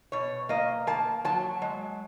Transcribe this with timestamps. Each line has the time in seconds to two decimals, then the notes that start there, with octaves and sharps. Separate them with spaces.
0.12 B2 C#5
0.49 A#3 D#5
0.87 A#3 A5
1.25 F#3 A5
1.62 G#3